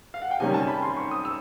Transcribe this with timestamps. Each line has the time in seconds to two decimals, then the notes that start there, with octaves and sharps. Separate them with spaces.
0.14 F5
0.22 F#5
0.31 G5
0.40 C3 D#3 G3 A#3 C#4 G#5
0.54 A5
0.68 B5
0.83 C6
0.97 C#6
1.11 D#6
1.25 E6